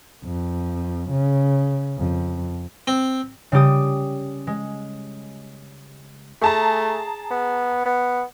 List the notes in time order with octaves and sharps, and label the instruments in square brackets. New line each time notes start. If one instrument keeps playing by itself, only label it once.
[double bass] F2
C#3
F2
[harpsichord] C4
[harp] C#3 G3 G4 D#6
G#3
[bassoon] A3 [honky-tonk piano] G#4 A5 A#5
[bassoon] B3
B3